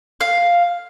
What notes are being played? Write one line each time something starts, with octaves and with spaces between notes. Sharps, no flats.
F5